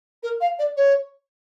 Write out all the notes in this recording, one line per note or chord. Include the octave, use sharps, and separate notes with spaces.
A#4
F5
D5
C#5